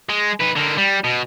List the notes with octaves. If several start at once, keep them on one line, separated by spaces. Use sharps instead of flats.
G#3
D#4 B4
D3 A#3
G3
B2